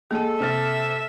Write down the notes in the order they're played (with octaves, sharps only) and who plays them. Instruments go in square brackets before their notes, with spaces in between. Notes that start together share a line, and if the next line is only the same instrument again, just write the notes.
[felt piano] G#3 D#7 [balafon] A#3 [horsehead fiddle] A4
[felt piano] C3 F6 A6 [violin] E5